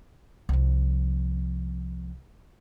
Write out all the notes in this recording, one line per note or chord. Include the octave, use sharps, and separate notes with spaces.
C2 F3